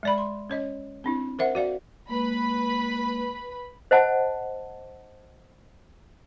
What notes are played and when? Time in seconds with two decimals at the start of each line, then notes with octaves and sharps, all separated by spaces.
0.03 G#3 D5 B5
0.18 C6
0.50 C#4 C#5 D#5
1.04 C4 D4 E4
1.39 A#4 C5 E5 F#5
1.55 F#4 D5 F5
2.09 G#3 A#3 B4 B5
3.91 C5 D#5 F#5 A5